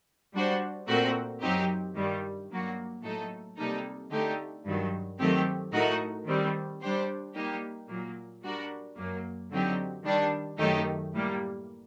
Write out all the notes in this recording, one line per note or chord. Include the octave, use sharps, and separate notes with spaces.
G3 D4 F#4 C5
A#2 A3 C4 F#4 A#4
F#2 F#3 C4 D#4 G4
G2 D#3 G3
G2 F#3 A#3 F#4
A2 F#3 A3 D#4 A4
C3 G3 A#3 D#4 A4
D3 A3 D#4 G4
G2 D#3 F#3
D#3 F#3 A3 C4 G4
A2 A3 D#4 F#4 A#4
D#3 G3 C4
G3 D4 G4 C5
G3 A#3 D#4 G4
A#2 F#3 A#3
G3 D4 F#4 A#4
F#2 F#3 A#3
D3 F#3 C4 D#4 G4
D#3 G3 D4
F#2 D#3 A3 D#4 G4
A2 G3 A#3